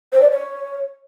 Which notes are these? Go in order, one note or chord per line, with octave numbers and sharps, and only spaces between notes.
C5
D5
C#5